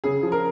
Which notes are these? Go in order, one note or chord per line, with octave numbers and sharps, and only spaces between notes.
C#3 G#4
F3
A#4